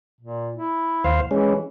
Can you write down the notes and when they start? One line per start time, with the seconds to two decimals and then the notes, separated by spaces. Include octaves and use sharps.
0.21 A#2
0.56 E4
1.04 D#2 C5 F5
1.31 E3 G#3 C#4